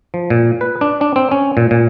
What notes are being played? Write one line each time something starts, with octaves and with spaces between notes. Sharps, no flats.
F3
A#2
B4
D4
D4
C4
C#4
A#2
A#2